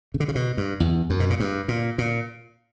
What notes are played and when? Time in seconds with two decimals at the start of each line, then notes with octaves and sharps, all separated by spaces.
0.14 C#3
0.20 D3
0.28 C#3
0.35 B2
0.57 G2
0.80 E2
1.10 F#2
1.20 B2
1.30 A#2
1.40 G2
1.68 A#2
1.98 A#2